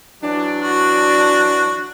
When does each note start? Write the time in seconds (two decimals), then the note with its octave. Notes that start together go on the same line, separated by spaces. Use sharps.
0.23 E3 F#3 D4
0.60 F#4